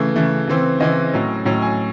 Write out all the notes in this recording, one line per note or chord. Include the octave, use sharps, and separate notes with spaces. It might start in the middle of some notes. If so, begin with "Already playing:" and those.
Already playing: C#3 E3 A3
C#3 E3 A3
C#3 E3 C4
C#3 E3 C4 D#5
A2 F#3 C#4
A2 F#3 C#4
G#5